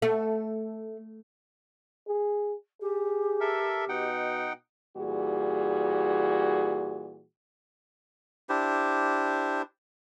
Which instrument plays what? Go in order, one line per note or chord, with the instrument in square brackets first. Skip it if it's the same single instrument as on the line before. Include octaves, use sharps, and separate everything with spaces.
[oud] A3
[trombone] G#4
[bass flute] G4 [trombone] G#4
[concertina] A4 A#4 E5
[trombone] B2 [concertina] D#4 F#5 G5
[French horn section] A#2 E3 G3 F#4 G#4
[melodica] D4 E4 G4 C5